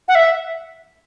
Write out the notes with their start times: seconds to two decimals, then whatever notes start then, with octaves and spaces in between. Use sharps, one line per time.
0.08 F#5
0.15 E5